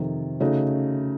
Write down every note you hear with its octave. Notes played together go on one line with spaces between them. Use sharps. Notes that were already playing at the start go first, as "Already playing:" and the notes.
Already playing: F2 C3 D#3
C#3 A3 D#4 F#4